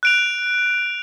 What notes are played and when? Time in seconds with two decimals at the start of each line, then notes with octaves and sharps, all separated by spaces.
0.03 F#6 D7 F7